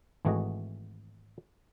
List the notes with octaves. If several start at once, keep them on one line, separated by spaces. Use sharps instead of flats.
G#1 E3 A3 F#4 G#4 D#5